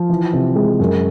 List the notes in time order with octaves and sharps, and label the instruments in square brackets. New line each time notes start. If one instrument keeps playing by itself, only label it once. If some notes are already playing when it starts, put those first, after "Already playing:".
Already playing: [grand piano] F3
E3
C3
G#3
F#2